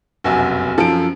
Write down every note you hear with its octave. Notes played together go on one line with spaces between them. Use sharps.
F1 B1 F#2 F#4 G#5
F#2 F3 A4 D7